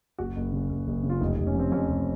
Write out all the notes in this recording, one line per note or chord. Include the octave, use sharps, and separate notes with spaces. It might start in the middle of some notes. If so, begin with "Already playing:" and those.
F#1 F#4
F#1
C#3
F#1
F#1
C#3
F4
F1 D#4
F1
C#4
F2 C4
F2 C#4
F1